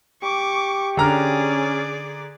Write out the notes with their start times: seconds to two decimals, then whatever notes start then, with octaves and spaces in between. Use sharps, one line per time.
0.23 G4 C#6 D6
0.97 D3 C#4 G#4 D5 A#5 F6